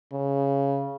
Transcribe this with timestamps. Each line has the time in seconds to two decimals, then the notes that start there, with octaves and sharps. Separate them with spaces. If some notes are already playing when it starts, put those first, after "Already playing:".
0.12 C#3